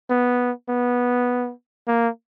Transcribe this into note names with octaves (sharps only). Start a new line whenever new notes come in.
B3
B3
A#3